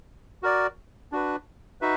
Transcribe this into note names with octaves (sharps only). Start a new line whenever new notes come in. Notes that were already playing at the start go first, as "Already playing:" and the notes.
F#4 A#4 D5
D4 F#4 B4
D#4 F#4 B4 E5